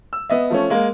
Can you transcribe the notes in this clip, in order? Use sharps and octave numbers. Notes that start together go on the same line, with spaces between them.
E6
B3 D#5 E5
F3 A3 C#4
G#3 A#3